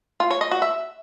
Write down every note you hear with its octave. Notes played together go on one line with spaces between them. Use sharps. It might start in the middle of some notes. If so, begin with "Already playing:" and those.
F4
C#5
D#5
F#4
E5